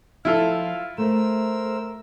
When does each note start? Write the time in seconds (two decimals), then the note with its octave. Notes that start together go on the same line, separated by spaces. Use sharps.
0.25 F3 E4 F4 A4 F5
0.98 A3 A#4 C5 E6